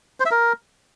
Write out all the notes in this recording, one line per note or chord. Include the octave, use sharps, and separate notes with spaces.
C5
E5
A#4